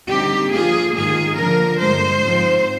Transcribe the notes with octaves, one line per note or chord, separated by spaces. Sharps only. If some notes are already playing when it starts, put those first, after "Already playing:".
D3 G3 C4 D#4 G4
D3 F3 A#3 F4 G#4
G#2 D#3 A#3 F4 G#4
D3 F3 A#3 D4 A#4
G2 D3 G#3 C5
G#2 F3 C4